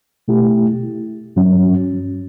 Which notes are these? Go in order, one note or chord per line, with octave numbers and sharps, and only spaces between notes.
B2 A3 E4 G4
G2 F#3 C#4